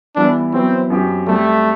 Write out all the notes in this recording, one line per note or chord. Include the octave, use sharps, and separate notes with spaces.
E3 G3 B3 D4 E4
F#3 B3 C4 E4
F#2 F#3 C4 G4
G3 A3 C4 G4